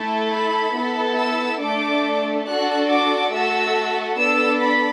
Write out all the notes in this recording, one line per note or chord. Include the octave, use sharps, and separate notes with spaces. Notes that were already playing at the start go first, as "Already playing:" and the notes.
Already playing: A3 E4 A4
B5
B3 E4 A4
E6
A3 D4 A4 D6
D4 F#4 A4 F#6
D6
A3 F#4 A4 E6
B3 D4 A4 E6
B5